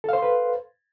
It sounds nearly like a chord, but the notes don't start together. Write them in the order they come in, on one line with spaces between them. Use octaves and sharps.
A4 F5 C5 C6 B4